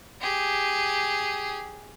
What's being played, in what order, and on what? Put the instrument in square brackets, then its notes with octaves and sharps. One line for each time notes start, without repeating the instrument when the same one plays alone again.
[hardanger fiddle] G4 G#4